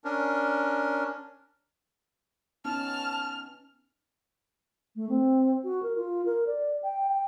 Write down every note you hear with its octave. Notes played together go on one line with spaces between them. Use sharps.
C#4 D4 A#4
B3 C#4 D#4 A5 F6
A3
C4
F#4
A#4
F4
A#4
D5
G5
G5